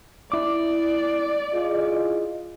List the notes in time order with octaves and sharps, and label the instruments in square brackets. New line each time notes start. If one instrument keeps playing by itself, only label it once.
[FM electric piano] E4 D6 [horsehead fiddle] D5
[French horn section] F4 G#4 D#5